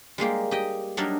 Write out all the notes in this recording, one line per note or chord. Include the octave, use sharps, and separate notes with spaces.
G3 G#3 A#3 G4
G4 D#5 G5
F#3 G3 D4 D#4 A#4 D5